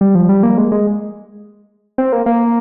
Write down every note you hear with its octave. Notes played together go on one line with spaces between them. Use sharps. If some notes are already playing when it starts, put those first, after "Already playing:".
G3
F3
G3
A#3
G#3
G#3
C4
A#3
A#3